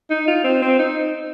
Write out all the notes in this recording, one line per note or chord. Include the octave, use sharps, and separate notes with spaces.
D#4
F4
C4
C4
D#4